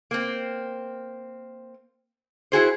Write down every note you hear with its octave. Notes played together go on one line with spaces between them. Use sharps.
A#3 C4
E4 F#4 G#4 C5